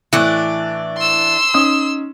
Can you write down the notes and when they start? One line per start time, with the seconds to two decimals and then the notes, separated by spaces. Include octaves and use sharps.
0.13 A2 E3 D4 C#6
0.97 C6 E6
1.54 C#4 D#4 D#6